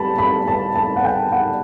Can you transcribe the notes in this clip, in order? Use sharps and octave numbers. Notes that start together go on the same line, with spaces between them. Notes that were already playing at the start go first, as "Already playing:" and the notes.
Already playing: G3 A5 B5
B5
A5
A5
F#5
G5
F#5